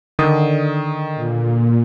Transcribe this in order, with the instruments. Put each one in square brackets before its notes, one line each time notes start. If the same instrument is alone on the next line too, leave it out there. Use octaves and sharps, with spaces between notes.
[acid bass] D3 [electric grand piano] D#3 D#6
[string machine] A#2